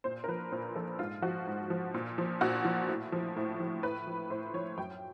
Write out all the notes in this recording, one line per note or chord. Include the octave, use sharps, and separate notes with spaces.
A#2 C5
A#4
F3 B4
A#2 C5
F3 A4
G#2 F4
F3 F#4
G#2
F3
A#2
F3
A#2 F#4
F3
A2
F3
A2
F3
A2 B4
F3
A2 C5
F3 C#5
F#2 G5